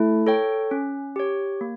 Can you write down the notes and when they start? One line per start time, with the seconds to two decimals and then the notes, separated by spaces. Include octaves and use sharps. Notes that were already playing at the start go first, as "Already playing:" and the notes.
Already playing: A3 E4
0.27 A4 C#5 G5
0.71 C#4
1.16 G4 C#5
1.61 A#3